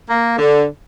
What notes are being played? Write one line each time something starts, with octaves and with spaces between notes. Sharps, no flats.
A#3
D3